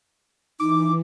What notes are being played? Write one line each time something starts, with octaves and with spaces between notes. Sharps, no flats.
E3 D#4 D6